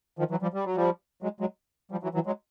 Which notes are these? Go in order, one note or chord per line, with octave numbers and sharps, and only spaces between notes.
D#3 F3
E3 F#3
F3 G3
G3
F#3
F3 G3
F#3 G#3
F#3 G#3
F3 G3
E3 F#3
E3 F#3
F#3 G#3